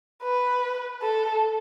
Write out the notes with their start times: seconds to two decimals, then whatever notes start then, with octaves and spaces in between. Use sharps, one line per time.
0.23 B4
1.02 A4